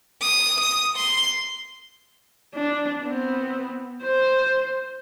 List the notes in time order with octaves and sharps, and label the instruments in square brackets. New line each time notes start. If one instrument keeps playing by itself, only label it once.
[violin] D#6
D#6
C6
[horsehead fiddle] D4
B3 C4
C5